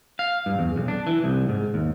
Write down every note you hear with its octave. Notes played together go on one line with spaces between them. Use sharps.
F5
G2
E2
B1
D4
E3
C2
G#2
D#2